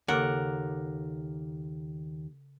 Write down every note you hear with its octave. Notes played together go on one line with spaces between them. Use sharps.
D#2 C#3 A4 A#4 F#5 D6